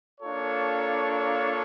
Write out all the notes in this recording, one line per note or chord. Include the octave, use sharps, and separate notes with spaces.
A#3 D4 F4 A4 C#5